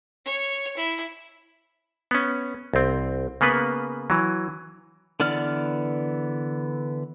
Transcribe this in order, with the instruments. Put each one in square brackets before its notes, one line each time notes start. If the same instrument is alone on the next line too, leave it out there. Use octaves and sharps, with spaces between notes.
[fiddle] C#5
E4
[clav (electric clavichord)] B3 C#4
C2 C4
C#3 A#3 B3 B4
E3 F#3
[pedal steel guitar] D3 E3 B3 D5 F6